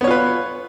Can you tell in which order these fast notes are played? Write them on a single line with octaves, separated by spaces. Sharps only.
B3 C#5 F4 B4